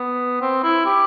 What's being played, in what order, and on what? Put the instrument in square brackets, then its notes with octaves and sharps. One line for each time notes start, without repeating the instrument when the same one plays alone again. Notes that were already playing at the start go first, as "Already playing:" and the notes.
Already playing: [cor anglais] B3
C4
E4
G4